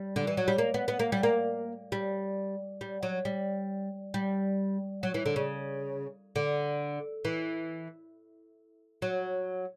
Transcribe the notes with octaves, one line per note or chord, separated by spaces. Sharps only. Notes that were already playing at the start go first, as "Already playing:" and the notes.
Already playing: G3
D3
E3
F#3
G3
A#3
B3
B3
A#3
G3
A#3
G3
G3
F#3
G3
G3
F#3
E3
D3
C#3
D3
E3
F#3